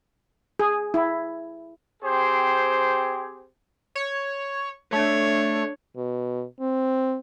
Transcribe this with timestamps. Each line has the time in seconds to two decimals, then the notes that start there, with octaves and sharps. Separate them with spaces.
0.59 G#4
0.94 E4
2.02 C4 G4 G#4 C5
3.95 C#5
4.92 A3 D4 C#5
5.96 B2
6.60 C4